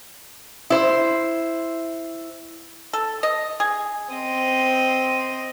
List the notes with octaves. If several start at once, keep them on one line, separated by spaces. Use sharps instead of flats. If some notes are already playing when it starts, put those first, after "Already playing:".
E4 C5
A4
D#5
G#4
C4 D#5